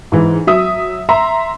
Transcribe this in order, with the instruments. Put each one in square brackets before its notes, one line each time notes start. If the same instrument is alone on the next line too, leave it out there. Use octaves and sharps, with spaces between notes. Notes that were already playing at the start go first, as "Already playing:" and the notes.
[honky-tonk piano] G#2 E3
F#3 E5 D#6
E5 A#5 C6